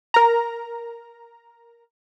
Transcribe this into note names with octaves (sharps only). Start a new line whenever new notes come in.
A#4 A#5